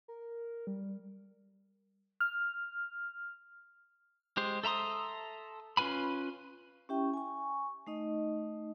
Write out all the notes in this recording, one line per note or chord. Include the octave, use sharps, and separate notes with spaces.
A#4
G3
F6
G#3 G4 C5
A4 E5 A#5 C6 D#6
C#4 F4 B4 G#5 B5
C#4 E4 G4 E5 G5 C#6
G#5 C#6
A3 D#4 D#5